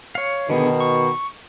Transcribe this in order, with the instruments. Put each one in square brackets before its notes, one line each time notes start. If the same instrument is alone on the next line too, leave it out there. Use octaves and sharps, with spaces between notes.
[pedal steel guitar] C#5 F5
[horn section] B2 D#3 [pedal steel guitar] D3 B3 G#4
[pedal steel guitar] C#6